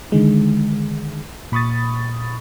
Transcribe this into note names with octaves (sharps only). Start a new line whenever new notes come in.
D3 D#3 G#3
A#2 B5 C#6 D#6 A6